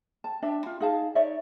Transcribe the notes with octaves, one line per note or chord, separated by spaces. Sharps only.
A5
D4 E5 A5
F4
D#4 G#4 F5 A5
D#4 C#5 D5 E5